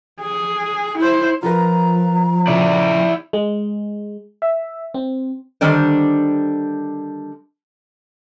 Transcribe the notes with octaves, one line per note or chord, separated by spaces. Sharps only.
G#4
E4 C5
F3 F4 A#4 B4 A#5
A#2 C#3 E4 D5
G#3
E5
C4
D3 D#3 G3 D4 G4 C5